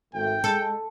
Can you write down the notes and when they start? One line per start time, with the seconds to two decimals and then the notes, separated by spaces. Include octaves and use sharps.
0.14 G#1 A3 G5
0.44 G#3 A4